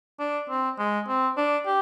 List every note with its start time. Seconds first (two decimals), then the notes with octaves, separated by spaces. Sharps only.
0.19 D4
0.49 C4
0.79 G#3
1.08 C4
1.37 D4
1.66 G4